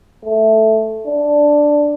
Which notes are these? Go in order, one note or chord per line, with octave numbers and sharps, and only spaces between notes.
A3
D4